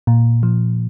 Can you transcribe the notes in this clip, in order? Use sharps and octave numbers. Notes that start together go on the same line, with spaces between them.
A#2
F3